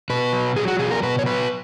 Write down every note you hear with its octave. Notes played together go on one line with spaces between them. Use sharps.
B2 B4
F#3
F#3 G#4
F#4
B2 G#4
A#4
B2 B4
C#5
F#3 B4